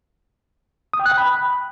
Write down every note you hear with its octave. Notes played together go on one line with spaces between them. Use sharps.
D#6
G5
F#6
G5
B5